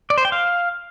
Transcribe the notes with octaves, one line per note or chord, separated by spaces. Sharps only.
D5
C5
G5
F5